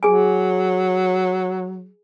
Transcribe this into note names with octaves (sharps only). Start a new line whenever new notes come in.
F#3 G#4 G#5